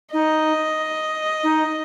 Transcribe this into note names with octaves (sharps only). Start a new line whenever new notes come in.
D#4 D#5
D#4